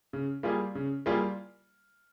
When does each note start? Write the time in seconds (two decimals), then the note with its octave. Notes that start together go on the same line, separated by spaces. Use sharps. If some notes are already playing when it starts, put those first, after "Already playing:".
0.13 C#3
0.43 G3 A#3 F4 G#4
0.75 C#3
1.06 G3 A#3 F4 G#4